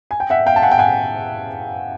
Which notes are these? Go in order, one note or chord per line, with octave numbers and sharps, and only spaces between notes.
G#5
G5
E5 F#5
F5 G5
A5
F#5 G#5
G5
F#5 G#5